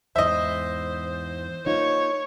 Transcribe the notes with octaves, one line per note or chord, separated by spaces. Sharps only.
E2 G#2 E3 C5 D#5 E5
A#3 D#4 F4 C#5